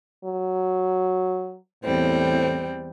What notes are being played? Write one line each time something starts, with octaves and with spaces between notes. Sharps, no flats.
F#3
E2 A2 G3 C4